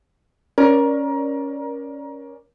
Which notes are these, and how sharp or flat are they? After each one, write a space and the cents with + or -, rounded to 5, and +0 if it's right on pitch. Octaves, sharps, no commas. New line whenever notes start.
C#4 +0 A#4 +20 D5 +0